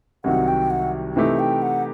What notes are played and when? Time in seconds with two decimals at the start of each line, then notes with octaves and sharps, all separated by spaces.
0.24 C2 C3 D#3 F#3 F#5
0.48 G5
0.70 F#5
1.16 C3 E3 A3 D#4 G4 E5
1.39 G5
1.62 F#5